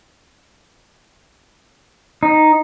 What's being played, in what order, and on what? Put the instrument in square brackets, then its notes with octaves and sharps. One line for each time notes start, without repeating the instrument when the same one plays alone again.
[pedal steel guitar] D#4